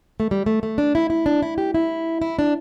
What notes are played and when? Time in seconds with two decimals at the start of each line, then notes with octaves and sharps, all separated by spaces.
0.20 A3
0.31 G3
0.46 A3
0.63 A3
0.78 D4
0.95 E4
1.10 E4
1.26 D4
1.42 E4
1.58 G4
1.74 E4
2.22 E4
2.39 D4